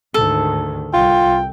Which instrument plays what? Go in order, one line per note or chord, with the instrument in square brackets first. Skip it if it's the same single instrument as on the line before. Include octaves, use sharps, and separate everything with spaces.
[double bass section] D2 G#2 D#3 [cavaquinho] A4
[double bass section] C2 [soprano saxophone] F4 [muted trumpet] G5